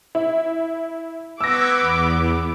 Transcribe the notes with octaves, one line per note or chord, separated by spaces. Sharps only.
E4
B3 C#6 D6 E6 G#6 A#6 B6
E2